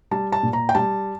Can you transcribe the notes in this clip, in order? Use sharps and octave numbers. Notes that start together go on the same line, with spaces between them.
G3 A5
A5
A#2
A#5
G5
G3 A5